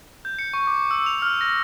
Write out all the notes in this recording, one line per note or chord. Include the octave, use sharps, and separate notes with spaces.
G6
C#7
C#6
D6
E6
F7
F6
A#6